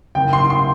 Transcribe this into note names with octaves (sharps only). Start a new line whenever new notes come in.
F#1 G5
C6
C6